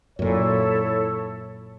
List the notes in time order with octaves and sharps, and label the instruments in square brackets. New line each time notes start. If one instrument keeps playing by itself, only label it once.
[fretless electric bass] F#2 A#2 [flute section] E4 A4 [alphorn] C#5